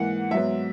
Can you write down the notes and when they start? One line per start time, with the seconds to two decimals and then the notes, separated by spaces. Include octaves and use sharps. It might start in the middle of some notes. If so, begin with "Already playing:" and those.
Already playing: G#2 E3 A#3 F#5
0.31 G#2 F#3 B3 E5